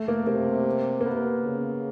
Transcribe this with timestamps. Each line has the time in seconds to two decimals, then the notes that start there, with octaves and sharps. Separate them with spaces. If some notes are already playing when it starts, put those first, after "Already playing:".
Already playing: A3
0.08 A#3
0.27 C3 A#3
1.01 A#3
1.05 B3
1.44 C#3